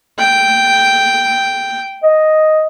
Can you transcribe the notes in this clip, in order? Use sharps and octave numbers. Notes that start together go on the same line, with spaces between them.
G5
D#5